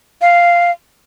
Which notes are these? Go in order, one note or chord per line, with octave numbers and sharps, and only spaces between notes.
F5